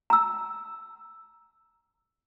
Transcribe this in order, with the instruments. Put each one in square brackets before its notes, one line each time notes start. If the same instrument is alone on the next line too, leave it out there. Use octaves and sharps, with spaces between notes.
[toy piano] A#5 E6